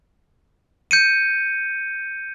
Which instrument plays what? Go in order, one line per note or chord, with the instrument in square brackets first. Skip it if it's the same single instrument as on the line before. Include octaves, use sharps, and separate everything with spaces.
[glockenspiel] G6 C#7 D#7